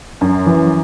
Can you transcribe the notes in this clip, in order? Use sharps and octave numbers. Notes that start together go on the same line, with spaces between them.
F#2
E3